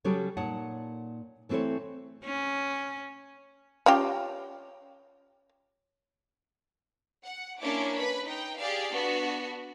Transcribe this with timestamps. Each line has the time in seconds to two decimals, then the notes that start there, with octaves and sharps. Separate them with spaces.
0.04 C#3 F#3 G3 C#4 G4 A4
0.37 A#2 D#4 C#5 F#5 A5
1.49 E3 A3 C4 E4 A4 C#5
2.24 C#4
3.86 C#4 F4 G4
7.23 F#5
7.60 A#3 C#4 D4 E4 D6
7.94 B4 B5
8.26 D#4 G5
8.58 G4 G#4 D5 F5
8.92 B3 D4 F#4